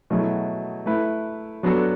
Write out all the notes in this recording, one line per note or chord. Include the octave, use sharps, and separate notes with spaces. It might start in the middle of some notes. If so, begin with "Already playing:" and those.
B2 F#3 A3 E4 G#4
A3 E4 B4
F#3 B3 D4 F#4 A4